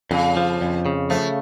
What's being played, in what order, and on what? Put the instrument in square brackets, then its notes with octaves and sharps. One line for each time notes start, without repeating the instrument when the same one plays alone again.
[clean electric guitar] F2 [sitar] C#3
[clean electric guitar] F3
F2
C#3
[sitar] F3 [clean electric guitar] A3